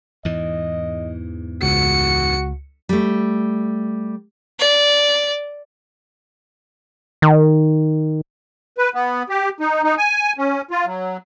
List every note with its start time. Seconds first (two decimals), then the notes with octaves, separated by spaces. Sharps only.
0.25 E2 G#2 E3 D#5
1.62 C#2 F#4 C#7
2.89 G3 A3
4.59 D5
7.22 D#3
8.78 B4
8.94 B3
9.29 G4
9.60 D#4
9.83 D#4
9.98 G#5
10.38 C#4
10.71 F4
10.86 F#3